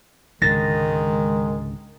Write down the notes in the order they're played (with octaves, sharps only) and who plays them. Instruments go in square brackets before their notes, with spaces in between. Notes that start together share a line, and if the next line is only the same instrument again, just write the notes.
[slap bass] C#2 G#2 D3 [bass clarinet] D#3 [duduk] G#3 [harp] A6 A#6